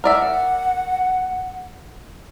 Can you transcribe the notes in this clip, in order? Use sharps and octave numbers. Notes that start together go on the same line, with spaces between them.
A#4 D5 E5 F#5